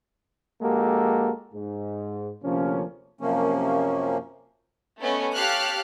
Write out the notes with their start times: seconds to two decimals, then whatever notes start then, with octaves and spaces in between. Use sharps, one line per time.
0.62 A#1 G#3 A#3 F#4 G4 A4
1.54 G#2
2.44 D2 C3 F3 A#3 C#4
3.21 F#2 C3 F3 A#3 C#4
5.00 A3 B3 C#4 D#5
5.34 G4 C#5 F5 A5 F6 F#6